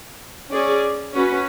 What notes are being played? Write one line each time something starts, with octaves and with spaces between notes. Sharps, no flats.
C#4 G#4 D5
C#4 F#4 B4